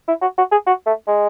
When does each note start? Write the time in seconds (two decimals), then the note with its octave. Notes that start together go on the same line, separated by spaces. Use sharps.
0.08 E4
0.21 F#4
0.38 F#4
0.51 G#4
0.66 F#4
0.86 A3
1.07 G#3